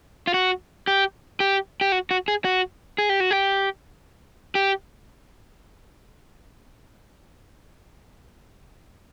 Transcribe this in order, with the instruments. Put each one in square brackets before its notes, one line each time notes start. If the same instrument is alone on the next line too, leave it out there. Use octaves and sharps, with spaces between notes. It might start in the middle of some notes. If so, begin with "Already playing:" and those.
[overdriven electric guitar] F4
F#4
G4
G4
G4
F#4
F#4
G#4
F#4
G#4
G4
F#4
G4
G4